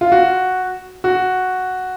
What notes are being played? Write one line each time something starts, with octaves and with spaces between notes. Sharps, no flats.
F4
F#4
F#4